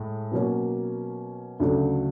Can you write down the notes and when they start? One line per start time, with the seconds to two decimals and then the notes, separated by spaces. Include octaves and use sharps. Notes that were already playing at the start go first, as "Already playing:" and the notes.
Already playing: A2 G#3
0.32 B2 F#3 A#3 C#4
1.60 D2 C#3 F#3 A3 D4